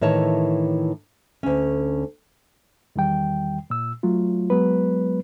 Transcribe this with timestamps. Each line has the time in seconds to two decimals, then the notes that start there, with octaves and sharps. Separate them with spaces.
0.01 A2 D#3 E3 C#5 A5
1.43 D2 C#4
2.96 E2 D#3 G3 G5
3.70 A#2 E6
4.03 F#3 A3 F4
4.50 F#3 G#3 B3 B4